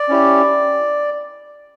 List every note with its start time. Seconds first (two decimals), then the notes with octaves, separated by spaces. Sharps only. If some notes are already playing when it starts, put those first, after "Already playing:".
Already playing: D5
0.09 C#4 E4 G4